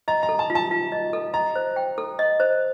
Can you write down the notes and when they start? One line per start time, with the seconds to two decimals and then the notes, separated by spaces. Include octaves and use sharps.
0.08 D#5 A#5
0.23 A#5
0.29 A4
0.39 A5
0.50 F4
0.55 A5
0.71 F4
0.92 D#5
1.13 A4
1.34 D#5 A#5
1.56 C5
1.76 G5
1.98 A4
2.19 D#5
2.40 C5